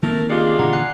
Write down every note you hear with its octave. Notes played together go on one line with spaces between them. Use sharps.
D#3 A3 A#3 C4 A#4
C#3 D4 F4 G4 G#4 D#5
A#2 D3 E3 F#5 A#5
G#5 F#6 C7